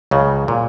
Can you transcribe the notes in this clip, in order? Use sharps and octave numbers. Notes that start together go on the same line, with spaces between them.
C#2 C#3
A#2